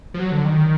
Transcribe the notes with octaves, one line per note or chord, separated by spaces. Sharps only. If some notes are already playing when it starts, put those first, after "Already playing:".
F3
F#3
D3
D#3